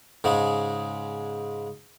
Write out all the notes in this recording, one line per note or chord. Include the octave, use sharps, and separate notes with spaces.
G#2 C#3 G#3